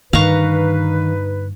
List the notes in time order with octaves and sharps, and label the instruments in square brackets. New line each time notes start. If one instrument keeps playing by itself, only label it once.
[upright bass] G2 D3 [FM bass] D#3 [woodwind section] D#4 B4 [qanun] F5 A#5 C#6